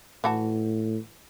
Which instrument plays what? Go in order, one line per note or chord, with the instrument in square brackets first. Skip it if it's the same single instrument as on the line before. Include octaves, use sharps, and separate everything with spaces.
[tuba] A2 [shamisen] E3 F#4 A5